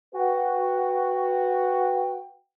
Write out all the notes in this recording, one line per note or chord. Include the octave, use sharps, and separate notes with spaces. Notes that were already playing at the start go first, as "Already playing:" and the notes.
F#4 B4 F#5 G5